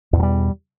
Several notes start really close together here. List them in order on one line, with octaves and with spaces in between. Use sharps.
E2 B2 F#3 G3